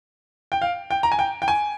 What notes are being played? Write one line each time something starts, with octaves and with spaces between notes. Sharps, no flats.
G5
F5
G5
A#5
G#5
G5
G5
G#5